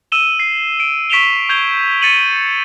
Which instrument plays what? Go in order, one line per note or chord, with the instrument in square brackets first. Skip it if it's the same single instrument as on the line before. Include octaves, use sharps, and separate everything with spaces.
[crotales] E6 D#7 E7 G7
C7
D7
C#6 B6 D7 E7 F7 G7
C#6 G6 G#6 F7 G7
A6 C#7 D#7 F#7